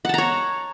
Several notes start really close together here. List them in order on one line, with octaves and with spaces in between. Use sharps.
F#5 A5 A#5 C#5